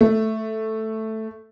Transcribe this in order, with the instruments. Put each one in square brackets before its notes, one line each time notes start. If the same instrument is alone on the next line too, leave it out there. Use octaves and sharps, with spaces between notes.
[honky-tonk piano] A3